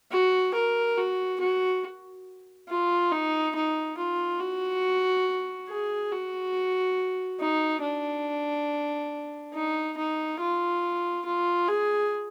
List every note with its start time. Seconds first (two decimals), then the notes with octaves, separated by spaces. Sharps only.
0.12 F#4
0.54 A#4
0.98 F#4
1.40 F#4
2.68 F4
3.12 D#4
3.55 D#4
3.98 F4
4.40 F#4
5.69 G#4
6.12 F#4
7.40 D#4
7.83 D4
9.54 D#4
9.97 D#4
10.40 F4
11.26 F4
11.68 G#4